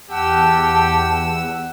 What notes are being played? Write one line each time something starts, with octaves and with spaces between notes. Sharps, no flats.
E2 G4 F#5 A5 E6